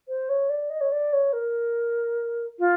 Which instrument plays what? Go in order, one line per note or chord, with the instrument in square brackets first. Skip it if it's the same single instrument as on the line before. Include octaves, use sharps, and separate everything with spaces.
[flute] C5
C#5
D5
D#5
C#5
D5
C#5
A#4
F4